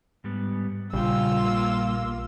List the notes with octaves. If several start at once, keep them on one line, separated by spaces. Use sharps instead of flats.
G#2 G3 B3
A#1 C#3 G3 F4 G4 E6
A#3